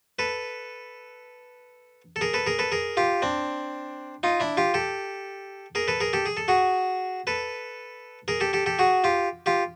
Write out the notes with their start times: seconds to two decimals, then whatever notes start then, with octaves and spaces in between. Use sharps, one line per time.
0.19 A4 B4
2.16 A4
2.21 G#4 A#4
2.34 A4 B4
2.46 G#4 A#4
2.59 A4 B4
2.72 G#4 A#4
2.97 F4 G4
3.22 C4 D4
4.23 D#4 F4
4.40 D4 E4
4.57 F4 G4
4.74 G4 A4
5.75 G#4 A#4
5.88 A4 B4
6.00 G#4 A#4
6.13 G4 A4
6.26 G#4
6.37 A4
6.48 F#4 G#4
7.27 A4 B4
8.28 G#4 A#4
8.40 G4 A4
8.53 G4 A4
8.66 G4 A4
8.79 F#4 G#4
9.04 F4 G4
9.46 F4 G4